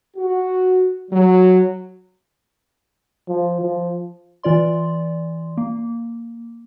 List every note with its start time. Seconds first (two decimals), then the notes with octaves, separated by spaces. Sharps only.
0.17 F#4
1.12 F#3
3.29 F3
3.61 F3
4.43 E3 F4 D5 C6
5.57 A#3